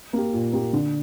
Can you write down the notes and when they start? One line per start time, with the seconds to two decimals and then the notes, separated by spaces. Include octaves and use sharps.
0.13 A#3 G4
0.33 A#2
0.53 A#3 G4
0.73 D3